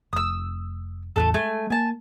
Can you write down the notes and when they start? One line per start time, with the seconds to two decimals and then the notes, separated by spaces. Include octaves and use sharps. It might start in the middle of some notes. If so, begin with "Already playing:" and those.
0.13 F1 D#6 E6
1.16 A1 E2 A2 A3 B3 A4
1.34 G#3 A3 G#5
1.70 A#3 G#5 A5